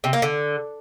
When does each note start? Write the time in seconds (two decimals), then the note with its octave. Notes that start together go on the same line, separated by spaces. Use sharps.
0.04 C3
0.13 A#3
0.22 D3